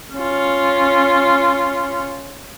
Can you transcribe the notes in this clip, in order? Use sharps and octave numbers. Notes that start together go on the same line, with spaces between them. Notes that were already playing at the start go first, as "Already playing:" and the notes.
C#4 F4